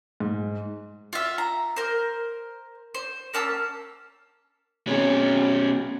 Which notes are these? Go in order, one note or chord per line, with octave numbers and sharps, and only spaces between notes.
G#2
F4 E5
A#5
A#4 C5
C5
A#3 C#4 A5 E6
B2 C4 C#4 G#4 C#5